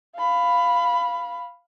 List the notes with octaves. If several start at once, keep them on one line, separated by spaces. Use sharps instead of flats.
F5 B5